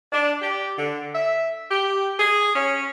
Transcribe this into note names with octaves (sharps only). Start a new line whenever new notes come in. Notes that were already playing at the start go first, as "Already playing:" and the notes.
D4
G4
D3
E5
G4
G#4
C#4